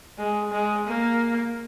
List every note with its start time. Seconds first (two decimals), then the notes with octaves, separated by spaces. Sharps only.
0.18 G#3
0.52 G#3
0.88 A#3